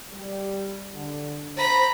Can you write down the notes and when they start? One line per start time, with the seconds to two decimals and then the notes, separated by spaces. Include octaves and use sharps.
0.12 G3
0.94 D3
1.57 C5 A#5 B5